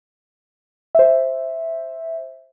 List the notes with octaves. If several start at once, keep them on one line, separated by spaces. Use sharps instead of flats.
C5 E5